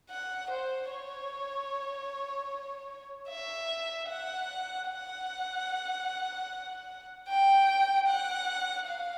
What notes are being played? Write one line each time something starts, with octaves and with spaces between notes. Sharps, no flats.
F#5
C5
C#5
E5
F#5
F#5
G5
F#5
F5